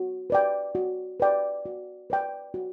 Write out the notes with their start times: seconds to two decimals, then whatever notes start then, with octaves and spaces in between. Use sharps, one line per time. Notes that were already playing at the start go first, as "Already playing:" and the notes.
Already playing: F#4
0.30 B4 D5 G5
0.75 F#4
1.20 B4 D5 G5
1.66 F#4
2.10 B4 D5 G5
2.54 F#4